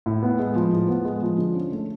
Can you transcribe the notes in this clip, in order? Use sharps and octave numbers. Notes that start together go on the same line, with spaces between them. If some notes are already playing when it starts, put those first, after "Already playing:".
A2
B3
G#3
F3
A2
B3
G#3
F3
D3
C#4
A3